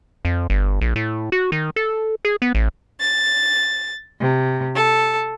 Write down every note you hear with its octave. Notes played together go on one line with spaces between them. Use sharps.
F2
G1
A#1
A2
F#4
D#3
A4
G#4
B3
A1
A6
C3
A4